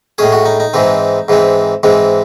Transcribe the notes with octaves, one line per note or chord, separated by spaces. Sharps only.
A2 G#3 C#4 G#4
F#4
D#4
D#4
G#2 E3 G#3 C4
G#2 E3 G#3 C4
G#2 E3 G#3 C4